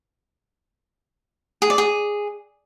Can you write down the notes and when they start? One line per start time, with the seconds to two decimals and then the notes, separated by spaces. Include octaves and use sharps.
1.62 G#4
1.70 D5
1.78 G#4